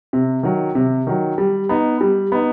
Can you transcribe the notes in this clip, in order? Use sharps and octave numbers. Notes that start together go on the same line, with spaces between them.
C3
D#3 F#3
C3
D#3 F#3
G3
B3 D#4
G3
B3 D#4